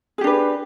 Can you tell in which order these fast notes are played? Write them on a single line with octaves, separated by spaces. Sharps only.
G#4 G4 D4 B4